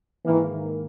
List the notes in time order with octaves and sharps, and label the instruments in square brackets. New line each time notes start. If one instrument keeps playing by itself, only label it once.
[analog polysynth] G#2 D#3 A#3 [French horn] E3